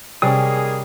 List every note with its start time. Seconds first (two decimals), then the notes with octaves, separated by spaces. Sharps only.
0.22 C3 D#3 G3 A#3 C#4 G#4